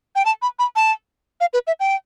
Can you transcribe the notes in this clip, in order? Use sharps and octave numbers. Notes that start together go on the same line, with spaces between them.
G5
A5
B5
B5
A5
F5
B4
E5
G5